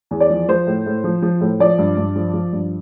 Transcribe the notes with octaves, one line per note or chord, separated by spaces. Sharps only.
E2
D5
F3
F3 C5
A2
A2
F3
F3
A2
F3 D5
G2
G2
F3
F3
G2